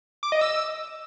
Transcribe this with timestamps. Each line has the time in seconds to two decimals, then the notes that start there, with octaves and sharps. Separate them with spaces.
0.23 D6
0.32 D#5
0.41 E6